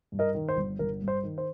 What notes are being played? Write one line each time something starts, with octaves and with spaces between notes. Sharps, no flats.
G2
A#4 D#5
D#3
C5
G1
G1 A#4
G2
C5
D#3
C5